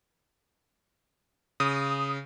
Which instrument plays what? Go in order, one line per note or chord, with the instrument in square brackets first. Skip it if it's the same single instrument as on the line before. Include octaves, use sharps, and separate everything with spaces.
[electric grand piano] C#3 [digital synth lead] D#6